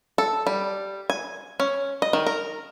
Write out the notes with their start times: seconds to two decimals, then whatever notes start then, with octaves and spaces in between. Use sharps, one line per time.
0.18 A4
0.47 G3
1.10 G#5
1.60 C#4
2.02 D#5
2.13 D#3
2.27 A#4